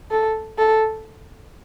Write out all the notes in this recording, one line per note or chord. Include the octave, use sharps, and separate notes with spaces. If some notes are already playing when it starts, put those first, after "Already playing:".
A4
A4